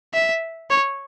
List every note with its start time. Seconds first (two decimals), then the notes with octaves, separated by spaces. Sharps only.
0.14 E5
0.70 C#5